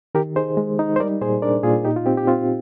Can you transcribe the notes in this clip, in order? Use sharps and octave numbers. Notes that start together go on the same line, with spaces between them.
D#3 G4 A#4
D#4 G#4 C5
G#3
D#4
C5
G3 A#4 D5
A#2 G#4 C5
D4 A#4 D5
A#2 F4 G#4
D#4 G4
F4
C4 G4
G4
C4 F4